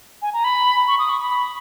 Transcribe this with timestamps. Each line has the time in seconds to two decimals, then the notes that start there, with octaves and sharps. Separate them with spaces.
0.22 G#5
0.33 A#5
0.44 B5
0.88 C#6
0.99 D#6
1.10 C#6
1.20 B5